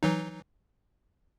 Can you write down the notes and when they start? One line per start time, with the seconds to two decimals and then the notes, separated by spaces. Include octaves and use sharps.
0.03 E3 F#3 D#4